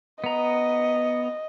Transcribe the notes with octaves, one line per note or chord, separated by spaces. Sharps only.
B3 D#5 A#5